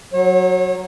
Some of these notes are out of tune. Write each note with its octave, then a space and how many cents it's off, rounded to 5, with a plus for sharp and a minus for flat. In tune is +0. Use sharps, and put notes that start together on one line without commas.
F#3 +0 C#5 -35